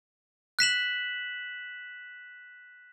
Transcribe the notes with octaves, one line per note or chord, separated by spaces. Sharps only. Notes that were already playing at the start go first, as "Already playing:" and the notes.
F#6 B6 E7 F#7